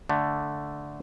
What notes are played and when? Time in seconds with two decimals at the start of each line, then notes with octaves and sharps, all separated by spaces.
0.09 D3 A3